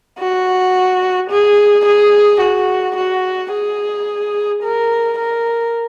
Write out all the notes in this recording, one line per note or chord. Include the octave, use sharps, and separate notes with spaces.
F#4
G#4
G#4
F#4
F#4
G#4
A#4
A#4